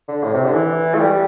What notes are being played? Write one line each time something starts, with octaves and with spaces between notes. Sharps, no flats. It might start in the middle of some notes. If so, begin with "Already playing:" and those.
D3
A2
C3
D3
E3
A3
G3